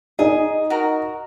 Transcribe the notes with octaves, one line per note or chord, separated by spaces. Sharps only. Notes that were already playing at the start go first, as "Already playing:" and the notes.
D#4 G#4
F#4 A#4